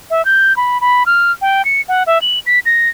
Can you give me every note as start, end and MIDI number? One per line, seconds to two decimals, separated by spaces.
0.10 0.24 76
0.25 0.55 91
0.57 0.80 83
0.81 1.03 83
1.06 1.32 89
1.42 1.65 79
1.65 1.81 97
1.89 2.03 78
2.07 2.21 76
2.22 2.39 102
2.46 2.59 95
2.66 2.89 94